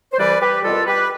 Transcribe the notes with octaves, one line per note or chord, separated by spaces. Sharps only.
C5
C2 C3 E3 G3 B4 D5
G4 B4
C2 B2 G3 F4 A4
G4 B4